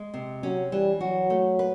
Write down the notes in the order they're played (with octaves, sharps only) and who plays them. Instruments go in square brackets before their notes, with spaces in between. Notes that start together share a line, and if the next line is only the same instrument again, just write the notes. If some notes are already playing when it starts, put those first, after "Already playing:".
Already playing: [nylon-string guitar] G#3
C3
[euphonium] F#3 [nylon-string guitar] C#4
[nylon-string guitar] E3 [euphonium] G3
[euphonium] F#3 [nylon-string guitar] F#4
[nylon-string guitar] A3
B4